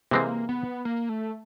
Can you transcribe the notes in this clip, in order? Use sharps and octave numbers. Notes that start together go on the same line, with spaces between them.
C3 E3 G#3 A#3 C4
B3
A#3
A3